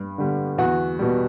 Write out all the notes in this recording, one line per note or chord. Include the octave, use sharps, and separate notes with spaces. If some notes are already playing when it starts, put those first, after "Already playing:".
Already playing: G2
D3 G3
E2 F#4
B2 G3